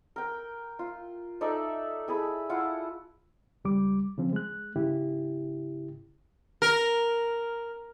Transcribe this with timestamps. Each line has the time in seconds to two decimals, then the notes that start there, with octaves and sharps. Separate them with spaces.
0.16 A#4 G5
0.79 F4
1.41 D#4 A4 D5 E5
2.08 E4 G#4 A5 B5
2.49 E4 F4 F#5
3.65 C#2 G3 D6
4.18 C#3 F3 C4
4.33 G#3 F#6
4.76 G#2 C#3 E4 G4
6.62 A#4